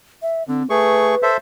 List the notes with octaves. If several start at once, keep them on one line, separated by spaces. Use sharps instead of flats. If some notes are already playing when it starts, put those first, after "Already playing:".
E5
D3 C4
A3 G#4 B4 C#6
A4 C5 E5